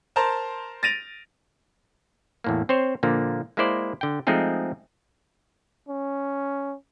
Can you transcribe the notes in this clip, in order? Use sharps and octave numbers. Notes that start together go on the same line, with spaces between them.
A#4 C5 A5 A#5 C6
A6 A#6 D7 D#7 F7
E2 A2 A#3
C4 C5 C#5
A#2 D3 F3 A#3
G#3 A#3 E4 C5 D5
D3 G5
F3 G#3 A3 C4 D#4 G#4
C#4